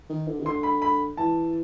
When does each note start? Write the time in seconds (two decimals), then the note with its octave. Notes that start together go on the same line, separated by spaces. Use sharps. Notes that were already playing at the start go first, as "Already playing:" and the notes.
0.10 D#3
0.28 D3
0.40 D#3
0.45 D3 C6
0.63 B5
0.82 B5
1.17 E3 A5